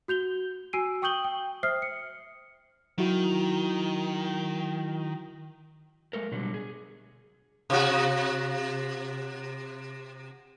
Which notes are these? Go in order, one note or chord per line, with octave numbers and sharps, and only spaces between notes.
F#4 G6 F7 G7
F#4 G#5 E6 C7 D7 D#7
G5 C#6 D#6 G6 F#7 G7
G5
C5 E5 D#6 F6 C7
C#7
D#3 F#3 E4 F#4
G#3 A4 A#4
B2 D3 F#3 G3
G#4
C3 F#4